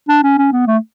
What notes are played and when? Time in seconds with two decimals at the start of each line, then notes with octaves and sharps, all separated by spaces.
0.09 D4
0.23 C#4
0.38 C#4
0.52 B3
0.67 A3